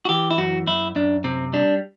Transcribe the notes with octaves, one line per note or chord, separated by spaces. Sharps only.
F#4
E3 G4
E4
F#2 F#4
F#2 E4
F#2 D4
C3 C4
G3 D4